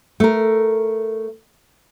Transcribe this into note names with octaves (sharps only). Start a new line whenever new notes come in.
A3 A#4